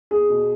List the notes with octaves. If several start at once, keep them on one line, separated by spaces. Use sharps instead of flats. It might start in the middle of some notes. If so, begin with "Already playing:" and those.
E2 G#4
B2